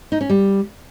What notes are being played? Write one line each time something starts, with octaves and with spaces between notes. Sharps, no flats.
D#4
C#4
G3